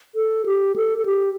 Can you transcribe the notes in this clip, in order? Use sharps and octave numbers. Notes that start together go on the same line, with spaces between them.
A4
G4
A4
A4
G4